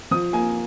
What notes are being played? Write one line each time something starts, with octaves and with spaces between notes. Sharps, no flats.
F3 D#6
A#3 G#5